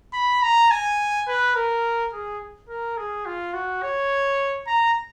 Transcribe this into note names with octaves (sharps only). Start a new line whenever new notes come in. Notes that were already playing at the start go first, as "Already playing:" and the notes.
B5
A#5
G#5
B4
A#4
G#4
A#4
G#4
F4
F#4
C#5
A#5